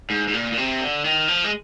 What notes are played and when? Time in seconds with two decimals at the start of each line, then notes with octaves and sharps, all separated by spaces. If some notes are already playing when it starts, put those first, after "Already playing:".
0.10 G#2
0.28 G#2
0.34 A#2
0.52 A#2
0.57 C3
0.81 D3
1.05 D#3
1.28 F3
1.44 G#3